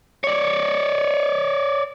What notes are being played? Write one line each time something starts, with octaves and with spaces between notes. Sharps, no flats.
C#5 D5